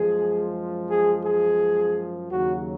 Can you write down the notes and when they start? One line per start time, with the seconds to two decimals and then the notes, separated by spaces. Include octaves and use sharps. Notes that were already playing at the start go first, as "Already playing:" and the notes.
Already playing: F#2 F3 G#3 G#4
0.89 G#4
1.24 G#4
2.31 D#2 C#3 F#3 F#4